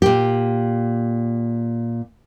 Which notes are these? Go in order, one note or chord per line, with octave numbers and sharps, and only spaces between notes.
A#2 G4